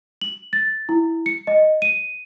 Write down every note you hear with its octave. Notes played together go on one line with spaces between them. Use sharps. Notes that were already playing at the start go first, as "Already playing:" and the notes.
F#7
A6
E4
C#7
D#5
D#7